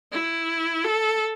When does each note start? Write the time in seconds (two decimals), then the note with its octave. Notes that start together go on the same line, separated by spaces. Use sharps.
0.13 E4
0.84 A4